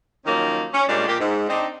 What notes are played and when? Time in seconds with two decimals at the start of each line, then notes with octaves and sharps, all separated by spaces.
0.26 D#3 F3 F#3 A#3 C#4 D#4
0.73 C#4
0.88 A#2 G3 G#3 A#3 C#4 D4
1.07 A#2 F3 A#3 G4
1.20 G#2
1.48 C4 D4 D#4